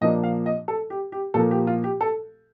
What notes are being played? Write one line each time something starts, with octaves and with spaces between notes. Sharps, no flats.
A#2 F3 A#3 D4 D#5
F5
D#5
A4
G4
G4
A#2 F3 A#3 A4
G4
F4
G4
A4